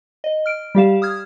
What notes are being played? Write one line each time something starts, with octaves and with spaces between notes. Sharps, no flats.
D#5
F6 D7
G3 G4 F5 E7
D#6 F6 G#6